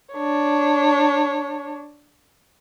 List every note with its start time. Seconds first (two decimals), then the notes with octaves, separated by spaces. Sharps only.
0.14 D4 C#5